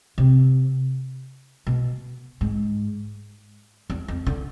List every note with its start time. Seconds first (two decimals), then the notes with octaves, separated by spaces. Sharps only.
0.18 C3
1.67 B2
2.41 G#2
3.90 E2
4.08 F2
4.27 D3